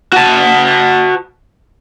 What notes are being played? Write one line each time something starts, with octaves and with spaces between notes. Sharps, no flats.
F#4 A5